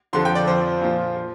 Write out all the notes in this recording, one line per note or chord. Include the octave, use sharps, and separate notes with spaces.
F2 D3 F3 C6
G5
D5
F2 F3 C5
A#2 F3
F3